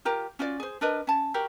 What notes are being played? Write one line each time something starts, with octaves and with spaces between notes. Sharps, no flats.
F4 G4 A#4 A#5
C#4 F4 F#4 D5
G#4 C5
D4 A#4 B4 D#5
C#4 A5
F#4 G4 A#4